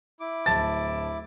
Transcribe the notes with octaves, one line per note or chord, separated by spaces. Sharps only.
E4 D6
D1 A5 A6